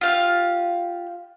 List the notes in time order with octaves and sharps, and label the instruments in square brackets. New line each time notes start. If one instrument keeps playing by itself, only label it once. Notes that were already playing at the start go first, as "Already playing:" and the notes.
[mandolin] F4 G4 F5